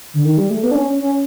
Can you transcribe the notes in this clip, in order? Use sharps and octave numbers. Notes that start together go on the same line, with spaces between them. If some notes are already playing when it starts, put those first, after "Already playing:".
D3
D#3
G3
A3
B3
D4
C#4
C#4